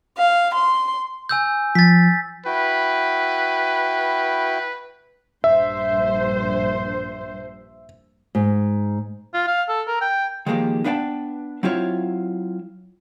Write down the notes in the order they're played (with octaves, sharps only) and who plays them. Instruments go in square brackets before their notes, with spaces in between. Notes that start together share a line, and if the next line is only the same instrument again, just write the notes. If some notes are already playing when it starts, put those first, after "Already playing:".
[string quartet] F5
C6
[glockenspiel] G#5 E6 G6
[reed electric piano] F3 [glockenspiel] A6 B6
[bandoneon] E4 F#4 G5 [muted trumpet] B4
[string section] A#1 G2 C5 [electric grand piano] E5
[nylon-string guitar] G#2
[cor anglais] F4
F5
A4
A#4
G5
[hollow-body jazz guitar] D#3 F3 G#3 A#3 G4
B3 D4 B4 F5 G5 A5
F#3 C4 E4 F4 C#5